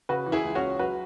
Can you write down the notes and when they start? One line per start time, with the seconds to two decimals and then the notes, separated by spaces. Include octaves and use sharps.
0.09 C#3 F#4 B4
0.26 E3
0.32 E4 G#4
0.44 C#2
0.55 C#4 F#4
0.61 C#2
0.79 F#3 F#4 B4